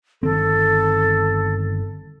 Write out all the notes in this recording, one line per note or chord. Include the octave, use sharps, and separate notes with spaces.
G1 D#3 C4 A4